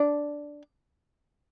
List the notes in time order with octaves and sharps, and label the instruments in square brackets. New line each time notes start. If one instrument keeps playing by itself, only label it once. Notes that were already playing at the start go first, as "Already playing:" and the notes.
Already playing: [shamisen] D4